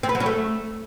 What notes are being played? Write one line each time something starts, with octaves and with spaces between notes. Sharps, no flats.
C4
B4
F#3
C#4
A3